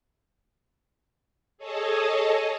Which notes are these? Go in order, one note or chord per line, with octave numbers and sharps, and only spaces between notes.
G#4 A4 C#5 D#5 A5